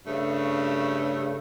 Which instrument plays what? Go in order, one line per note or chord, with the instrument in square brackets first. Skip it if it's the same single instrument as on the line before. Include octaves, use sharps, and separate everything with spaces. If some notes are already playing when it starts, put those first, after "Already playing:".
[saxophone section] G2 C#3 A3